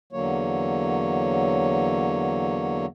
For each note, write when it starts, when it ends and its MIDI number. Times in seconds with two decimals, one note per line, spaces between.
0.13 2.86 40
0.13 2.86 50
0.13 2.86 54
0.13 2.86 58
0.13 2.86 73